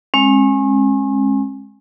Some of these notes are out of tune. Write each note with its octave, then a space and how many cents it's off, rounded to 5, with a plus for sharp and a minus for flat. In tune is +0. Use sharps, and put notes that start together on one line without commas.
G#3 +0 C#4 -45